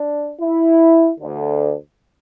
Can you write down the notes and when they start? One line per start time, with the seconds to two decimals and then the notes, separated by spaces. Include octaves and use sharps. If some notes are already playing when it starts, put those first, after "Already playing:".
Already playing: D4
0.42 E4
1.20 D2 D3